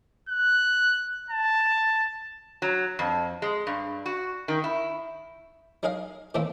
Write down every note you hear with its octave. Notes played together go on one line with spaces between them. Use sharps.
F#6
A5
F#3
F2
G#3
G2
F#4
D#3
E4
F#3 D#4 G#4 A#4 D#5 F5
A2 D#3 E3 A3 A#3 C4